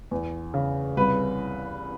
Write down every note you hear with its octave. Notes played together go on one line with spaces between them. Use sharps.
E2
C#3
C2 B4